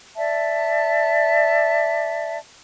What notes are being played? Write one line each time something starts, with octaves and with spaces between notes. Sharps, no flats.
D5 E5 A5